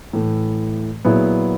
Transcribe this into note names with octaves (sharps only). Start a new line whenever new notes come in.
A2 E3 A3
A#2 F#3 B3 E4 G#4